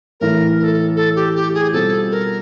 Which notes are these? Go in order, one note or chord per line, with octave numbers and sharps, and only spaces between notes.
A2 E3 A3 A#4
A#4
A4
A4
G4
G4
G#4
B2 G3 C4 F4 A4
A#4